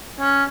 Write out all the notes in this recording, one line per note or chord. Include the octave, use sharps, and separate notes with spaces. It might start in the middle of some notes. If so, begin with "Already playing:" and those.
C#4